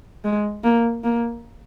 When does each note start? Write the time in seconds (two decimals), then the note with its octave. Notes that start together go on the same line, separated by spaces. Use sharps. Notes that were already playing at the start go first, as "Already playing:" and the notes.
0.25 G#3
0.64 A#3
1.04 A#3